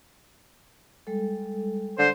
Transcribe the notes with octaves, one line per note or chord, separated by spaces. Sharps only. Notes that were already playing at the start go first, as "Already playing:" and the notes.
G3 G#3 A4
D3 C5